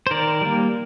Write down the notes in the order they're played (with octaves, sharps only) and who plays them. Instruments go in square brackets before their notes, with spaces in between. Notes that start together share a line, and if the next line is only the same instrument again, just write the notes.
[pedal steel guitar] C5
D#3 A#4 D5
G3 A#3